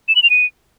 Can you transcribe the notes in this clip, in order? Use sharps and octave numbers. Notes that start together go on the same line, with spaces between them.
E7
F#7
F7
D#7